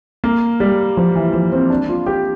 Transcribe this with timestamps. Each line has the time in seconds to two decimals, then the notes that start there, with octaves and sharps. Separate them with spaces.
0.24 A#3
0.60 G3
0.97 F3
1.15 E3
1.33 F3
1.52 C4
1.70 D4
1.89 F4
2.06 G4